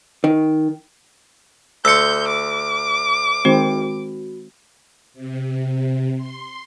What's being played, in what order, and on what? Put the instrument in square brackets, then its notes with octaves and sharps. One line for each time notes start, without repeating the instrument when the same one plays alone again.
[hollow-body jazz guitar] D#3
[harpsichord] D2 C6 [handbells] E6 C#7 [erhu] G6
[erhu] D6
[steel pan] D#3 G#3 C4 [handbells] F#4
[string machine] C3
C6